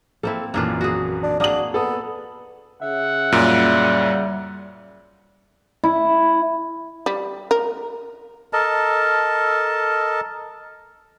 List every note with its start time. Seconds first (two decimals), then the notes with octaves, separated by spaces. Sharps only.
0.23 A#3 C4 E4 A4
0.54 A#1 F#2 E3 A#3 D4 F4
0.81 F#4 G#4
1.23 D4
1.40 A#3 D4 F#4 G#4 D#6 F#7
1.74 B3 A4 D#6
2.81 C#3 E5 F#5
3.32 F#2 A#2 G3
5.84 E4
7.06 G3
7.51 A#4
8.53 A4 A#4 D#5 A5